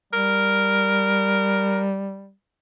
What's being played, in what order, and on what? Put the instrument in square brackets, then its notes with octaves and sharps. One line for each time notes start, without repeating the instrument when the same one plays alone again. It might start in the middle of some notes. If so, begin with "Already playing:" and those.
[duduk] G3 [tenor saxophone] A#4